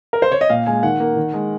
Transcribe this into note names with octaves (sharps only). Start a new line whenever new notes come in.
A#4
C5
C#5
D#5
A#2 F5
G#3 G#5
D#3 F#5
A#3
D#3
G#3